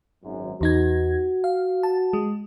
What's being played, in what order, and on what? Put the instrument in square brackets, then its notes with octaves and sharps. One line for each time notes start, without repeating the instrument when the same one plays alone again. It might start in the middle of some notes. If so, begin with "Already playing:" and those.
[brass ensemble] G#1 F#2
[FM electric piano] E2 D#4 G#6 [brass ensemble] F#4
[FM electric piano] F5
A5
G#3